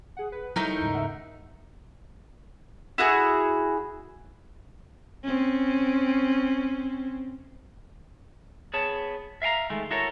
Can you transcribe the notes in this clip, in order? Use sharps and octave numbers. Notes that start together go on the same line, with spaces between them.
G#4 F#5
B4
F#3 G3 A3 D#4 E4 A#4 G6
D#2 G#2 C#3
E5 F#5
E4 F#4 G#4
C4 C#4
B3 G#4 C#5 A5
E5 F5 G5 A#5
D#3 G#3 A3
E4 F#4 A4 A#4 C#5